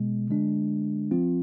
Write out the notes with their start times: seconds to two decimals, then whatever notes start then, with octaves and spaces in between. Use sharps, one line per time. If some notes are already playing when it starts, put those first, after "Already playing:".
Already playing: B2 G#3 B3
0.30 D3 G#3 D4
1.11 F3 C4 F4